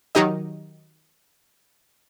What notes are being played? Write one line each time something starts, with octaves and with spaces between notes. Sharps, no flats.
D#3 F#3 D#4 G4 D#5